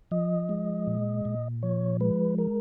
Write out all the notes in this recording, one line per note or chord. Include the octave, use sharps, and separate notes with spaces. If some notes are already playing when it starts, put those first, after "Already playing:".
F3 D#5
G#3
A#2
A#2
F3 C#5
G#3 B4
A#4